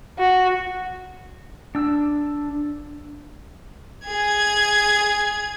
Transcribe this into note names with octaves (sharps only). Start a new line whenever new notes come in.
F#4
D4 E6
G#4 G#6